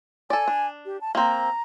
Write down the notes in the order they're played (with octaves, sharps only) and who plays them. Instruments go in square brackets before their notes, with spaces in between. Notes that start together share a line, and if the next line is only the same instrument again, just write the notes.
[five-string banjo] A4 D5 [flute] G#5
[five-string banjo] D4
[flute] G4
A5
[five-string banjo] A#3 C4 [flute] A#5